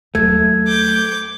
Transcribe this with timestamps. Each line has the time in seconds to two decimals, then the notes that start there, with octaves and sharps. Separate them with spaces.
0.15 D#2 F#3 A3 G#6
0.67 D6 G6